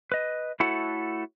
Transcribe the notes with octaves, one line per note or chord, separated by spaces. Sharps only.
B4 D#5
A3 E4 F#4 A4 C#5 F#5